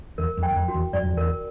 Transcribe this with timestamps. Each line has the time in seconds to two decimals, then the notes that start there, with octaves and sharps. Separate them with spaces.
0.18 E2 A#4
0.37 F2
0.43 G5
0.51 E2
0.56 F2
0.68 F#4
0.74 E2
0.93 F#2 D5
1.05 F2
1.16 E2 A#4